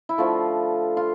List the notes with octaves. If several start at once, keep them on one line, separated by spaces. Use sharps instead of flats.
E4
D3 F3 A3 F4
F4